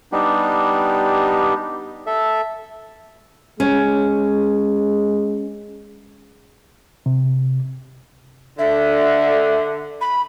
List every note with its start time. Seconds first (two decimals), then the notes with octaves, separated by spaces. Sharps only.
0.12 G3 B3 D4 D#4 G4
2.07 A4 E5
3.60 G#3 C#4
7.06 C3
8.58 D3 E5
10.01 B5